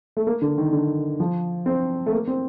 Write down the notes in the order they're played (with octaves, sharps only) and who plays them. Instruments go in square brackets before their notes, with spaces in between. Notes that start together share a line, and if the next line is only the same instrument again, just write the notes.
[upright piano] A3
A#3
D3
D#3
D3
F3
C4
A3
A#3
C4